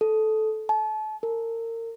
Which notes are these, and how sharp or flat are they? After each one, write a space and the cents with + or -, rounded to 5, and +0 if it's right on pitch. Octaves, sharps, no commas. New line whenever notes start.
A4 -15
A5 -35
A#4 -30